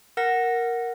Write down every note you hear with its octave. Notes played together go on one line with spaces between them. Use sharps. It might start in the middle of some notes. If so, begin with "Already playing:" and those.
A#4 F#5 A#6